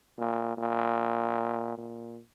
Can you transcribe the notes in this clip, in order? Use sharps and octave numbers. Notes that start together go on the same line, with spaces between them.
A#2
A#2
A#2